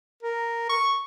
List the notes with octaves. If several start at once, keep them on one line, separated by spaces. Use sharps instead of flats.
A#4
C#6